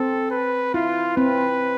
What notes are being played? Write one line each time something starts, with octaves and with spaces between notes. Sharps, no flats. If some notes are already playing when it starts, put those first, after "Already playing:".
Already playing: C4 A4
B4
E4 F4
C4 B4